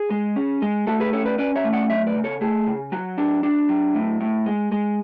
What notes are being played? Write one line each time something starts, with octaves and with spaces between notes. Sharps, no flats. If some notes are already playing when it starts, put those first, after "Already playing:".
Already playing: G#4
G#3
C#4
G#3
A3 F#4 A4
G#4 B4
C#4 A4 C#5
B4 D5
C#4 B4 D5
C#5 E5
A3
D5 F#5
F#3 C#5 E5
B4 D5
C#3
A4 C#5
A3 G#4
C#3
F#3 F#4
D4
D4
F#3
A2
A2
G#3
G#3